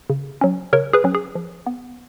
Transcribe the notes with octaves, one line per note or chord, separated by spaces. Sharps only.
C#3
F#3 C#4
C#3 A#4 C#5
G#4 B4
F#3 C#4
G#4
F3
B3